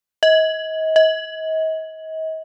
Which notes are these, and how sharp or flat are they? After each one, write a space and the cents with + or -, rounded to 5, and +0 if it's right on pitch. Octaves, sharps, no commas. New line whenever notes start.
D#5 +35
D#5 +40